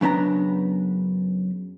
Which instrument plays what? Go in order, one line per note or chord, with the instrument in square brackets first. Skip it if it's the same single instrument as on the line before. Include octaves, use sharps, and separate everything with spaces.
[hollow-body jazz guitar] F#2 C#3 B3 D4 A#5